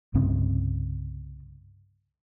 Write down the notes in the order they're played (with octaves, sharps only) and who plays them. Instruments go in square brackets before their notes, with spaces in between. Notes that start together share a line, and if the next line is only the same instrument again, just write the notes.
[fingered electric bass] C2 G2 C#3 C4